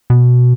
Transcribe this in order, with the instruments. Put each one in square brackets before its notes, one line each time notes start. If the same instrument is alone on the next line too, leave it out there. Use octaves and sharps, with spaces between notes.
[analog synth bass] B2